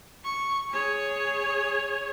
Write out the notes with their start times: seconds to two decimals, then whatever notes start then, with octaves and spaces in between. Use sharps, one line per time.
0.24 C#6
0.71 G#4 C#5